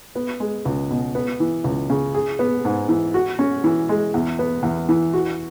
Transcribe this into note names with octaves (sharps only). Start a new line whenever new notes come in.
B3
G#3
C#2
B2
B3
E3
C#2
C#3
G#4
B3
G#2
E3
F#4
C#4
E3
G#3
E2
B3
E2
E3
F#4